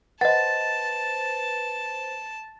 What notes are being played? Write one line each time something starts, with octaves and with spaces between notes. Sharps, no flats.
B4 C5 D#5 F#5 A5 A6